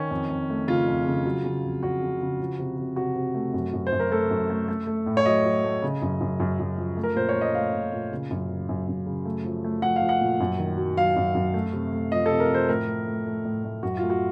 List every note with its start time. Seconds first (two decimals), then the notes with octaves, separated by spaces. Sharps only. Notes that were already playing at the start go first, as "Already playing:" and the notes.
Already playing: D#3 C#4
0.11 F2
0.30 F2
0.50 A3
0.68 C#3 F4
0.88 F2
1.07 C#3
1.25 F#3
1.44 C#3
1.64 F2
1.83 F2 F#4
2.02 C#3
2.21 C#3
2.40 F3
2.59 C3
2.78 C3
2.96 C3 F#4
3.15 C3
3.34 A3
3.53 F#2
3.73 F#2
3.87 C5
3.92 F#2
4.00 A#4
4.11 A3 A4
4.30 F#2
4.50 A3
4.68 A3
4.87 A3
5.06 A2
5.17 C#5
5.26 F#3 D#5
5.44 F#3
5.64 A3
5.82 C#3
6.02 F#2
6.21 F#2
6.40 F#2
6.60 F#2
6.77 F3
6.96 A3
7.03 A#4
7.16 A#2 C5
7.29 C#5
7.35 A3
7.41 D#5
7.55 A3 F5
7.73 A#2
7.92 A#2
8.12 C#3
8.31 F#2
8.49 C#3
8.69 F#2
8.88 F#2
9.06 C#3
9.25 A3
9.44 F3
9.64 A3
9.82 F3 F#5
9.96 F5
10.02 F3
10.09 F#5
10.21 A#2
10.40 F#2
10.59 D#3
10.78 F#3
10.97 F#3 F5
11.16 F#2
11.35 F#2
11.54 A3
11.73 C3
11.93 A3
12.12 F3 D#5
12.26 C3 A4
12.40 A#4
12.50 F3 C5
12.69 A2 A#4
12.87 A3
13.06 A3
13.26 A3
13.45 A2
13.64 A2
13.83 F#2 F#4
13.97 A3 F4
14.10 F#4